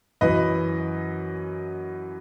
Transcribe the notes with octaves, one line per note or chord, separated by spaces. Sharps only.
F#2 E3 B4 D#5